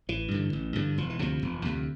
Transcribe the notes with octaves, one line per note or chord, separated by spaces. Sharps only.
A1 E3
G2 D3
A1
G2 D3
E1 F3
E3
D2 C3 F3
E1
D2 C3